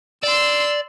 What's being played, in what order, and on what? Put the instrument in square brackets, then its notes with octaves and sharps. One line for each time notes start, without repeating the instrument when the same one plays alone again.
[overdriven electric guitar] D5 [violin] C6 E6